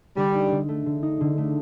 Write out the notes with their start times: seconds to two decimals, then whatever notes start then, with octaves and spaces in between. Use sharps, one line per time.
0.17 D3 G3
0.34 D#4
0.52 D3
0.68 A3
0.86 D3
1.03 D#4
1.21 D3
1.38 A3